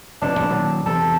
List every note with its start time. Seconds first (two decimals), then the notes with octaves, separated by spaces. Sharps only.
0.22 F1 B2 D4
0.38 A#1 A2 C3
0.49 A#2 D#3 F#3
0.86 E2 C3 A4